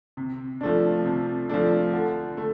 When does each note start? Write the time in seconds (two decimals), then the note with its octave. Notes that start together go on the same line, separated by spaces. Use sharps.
0.17 C3
0.61 F3 A3 D4
1.05 C3
1.49 F3 A3 D4
1.93 D3
2.37 A3